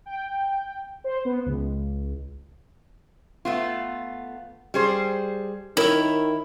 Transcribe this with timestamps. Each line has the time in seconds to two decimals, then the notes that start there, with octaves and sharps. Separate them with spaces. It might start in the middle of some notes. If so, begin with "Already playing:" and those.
0.06 G5
1.04 C5
1.25 B3
1.46 C#2
3.45 A3 B3 F4
4.74 G3 G#4 C5
5.77 D#3 E4 A#4 C#5 E5